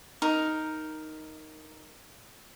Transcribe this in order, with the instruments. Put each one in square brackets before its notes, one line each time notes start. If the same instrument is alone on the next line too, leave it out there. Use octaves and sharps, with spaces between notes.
[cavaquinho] D#4 A#4